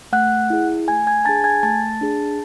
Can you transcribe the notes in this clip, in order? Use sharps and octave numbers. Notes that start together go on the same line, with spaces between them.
A3 F#5 F#6
E4 G#4
A3 G#5 G#6
G#5 G#6
D4 G#4 A5 A6
G#5 G#6
A3 A5 A6
D4 G#4